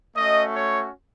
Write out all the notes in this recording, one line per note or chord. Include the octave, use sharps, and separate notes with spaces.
A3 C#4 F#4 D#5
C#5